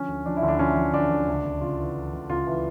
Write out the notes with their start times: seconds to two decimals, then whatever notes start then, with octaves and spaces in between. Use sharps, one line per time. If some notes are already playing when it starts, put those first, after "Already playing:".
Already playing: D3 F3 C#4
0.08 D2
0.26 F3 D4
0.37 E4
0.43 D2
0.48 D4
0.59 F3 C#4
0.77 F3
0.94 D2 D4
1.10 D2
1.28 C#2
1.45 C#2
1.61 C#3 F4
1.79 E3
1.95 E3
2.13 C#2
2.30 C#2 F4
2.47 E3